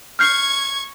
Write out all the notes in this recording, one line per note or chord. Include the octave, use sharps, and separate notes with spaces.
C#6 F6 G6 G#6 C7